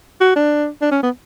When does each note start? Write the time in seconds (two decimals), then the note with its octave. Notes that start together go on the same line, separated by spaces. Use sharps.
0.21 F#4
0.36 D4
0.81 D4
0.91 C#4
1.02 B3